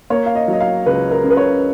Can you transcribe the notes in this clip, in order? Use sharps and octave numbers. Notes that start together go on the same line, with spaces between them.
A#3 C#5
F5
D#5
F#3 D#5
F5
C#2 B4
A#4
C#3
B4
C#5